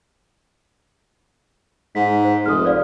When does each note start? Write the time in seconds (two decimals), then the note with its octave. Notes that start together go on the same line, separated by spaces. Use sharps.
1.95 G#2 B6
2.25 C5
2.46 F1 D#6 F6
2.65 C5 D5 F5